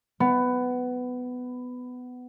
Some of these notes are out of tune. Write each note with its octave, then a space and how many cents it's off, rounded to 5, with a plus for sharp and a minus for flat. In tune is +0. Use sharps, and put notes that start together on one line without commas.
B3 +15